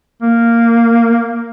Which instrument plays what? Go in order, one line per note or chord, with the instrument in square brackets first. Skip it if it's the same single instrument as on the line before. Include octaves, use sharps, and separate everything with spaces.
[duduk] A#3